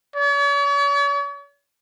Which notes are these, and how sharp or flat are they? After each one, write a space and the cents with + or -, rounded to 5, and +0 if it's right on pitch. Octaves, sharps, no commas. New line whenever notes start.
C#5 +45